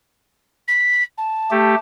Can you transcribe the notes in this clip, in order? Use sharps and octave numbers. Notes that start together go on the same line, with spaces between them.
B6
A5
A3 G4